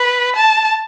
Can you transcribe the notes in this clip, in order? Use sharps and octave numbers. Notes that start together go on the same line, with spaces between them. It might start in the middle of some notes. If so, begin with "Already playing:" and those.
Already playing: B4
A5